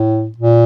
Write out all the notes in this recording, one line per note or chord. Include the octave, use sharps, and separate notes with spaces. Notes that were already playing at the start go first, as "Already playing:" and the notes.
Already playing: A2
A#2